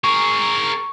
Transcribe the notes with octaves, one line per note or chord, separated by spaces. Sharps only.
G#4 A#4 C#6